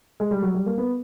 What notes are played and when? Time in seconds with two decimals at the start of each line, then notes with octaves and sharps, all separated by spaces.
0.20 G#3
0.31 G3
0.42 F#3
0.55 G3
0.66 A#3
0.78 B3